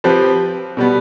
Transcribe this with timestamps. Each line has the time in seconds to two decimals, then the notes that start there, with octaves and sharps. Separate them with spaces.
0.04 F3 C4 G4 B4
0.77 B2 G3 B3